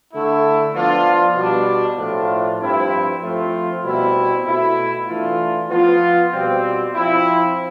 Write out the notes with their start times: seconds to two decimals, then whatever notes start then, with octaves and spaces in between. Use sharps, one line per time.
0.10 D3 A3 E4
0.73 F3 B3 D4 F4
1.35 B2 G3 D4
1.97 A2 F3 A3 D4 F4
2.59 G2 F3 C4 E4
3.22 F3 A3 C4 F4
3.84 B2 G3 C4 E4
4.46 B2 A3 E4
5.08 E3 A3 D4 F4
5.70 F3 B3 F4
6.32 B2 G3 C4
6.94 F3 C4 E4